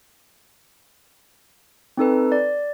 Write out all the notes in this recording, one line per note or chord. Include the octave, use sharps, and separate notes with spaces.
C4 D#4 A4 B4
D5